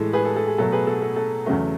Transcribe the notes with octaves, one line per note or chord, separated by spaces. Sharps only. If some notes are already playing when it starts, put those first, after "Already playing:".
Already playing: A2 E3 G#3 A4
G#4 B4
A4
A4
G#4
B2 F#3 A3 A4
G#4 B4
A4
A4
A4
E2 C#3 F#3 A3